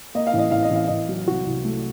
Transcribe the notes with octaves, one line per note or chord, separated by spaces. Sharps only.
A#3 D#5
F5
A1 D#5
A1 F5
D#5
A1 F5
A1 D#5
F#3
C2 F#4
C2
A3